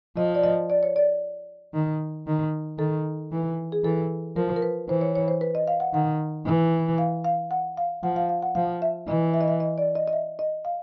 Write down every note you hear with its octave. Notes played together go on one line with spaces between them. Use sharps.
F3 D#5
D5
D#5
D5
C#5
D5
D#3
D#3
D#3 A4
E3
G#4
E3 A4
F3 A#4
A#4
B4
E3 C5
C#5
C#5
C5
B4
D#5
F5
F#5
D#3 F#5
E3
F5
F5
F#5
F5
F3 F#5
F5
F5
F#5
F3 F5
E5
E3 D#5
E5
D#5
E5
D#5
D5
D#5
D#5
E5
D#5
F5